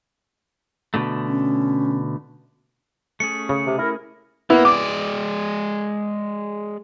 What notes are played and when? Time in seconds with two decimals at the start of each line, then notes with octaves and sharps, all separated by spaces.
0.94 B2 D3 A3
1.28 C#4
3.20 A3 C#4 G#4 C#7
3.49 C#3
3.66 C3
3.79 E4 A#4
4.50 A#3 B3 E4
4.65 G#3 D5 D6